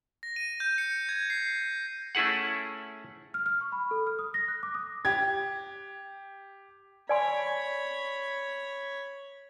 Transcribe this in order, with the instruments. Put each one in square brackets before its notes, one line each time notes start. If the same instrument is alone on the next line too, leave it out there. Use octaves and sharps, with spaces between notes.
[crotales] A#6
D#7
G6
C#7
G#6
C7
[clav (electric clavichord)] A3 C#4 E4 G#4 F#5
[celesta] F6
F6
C#6
B5
A4
F6
D#6
A#6
F#6
D6
D#6
[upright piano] G4 G#6
[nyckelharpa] C#5 B5 [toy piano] D5 G#5 C6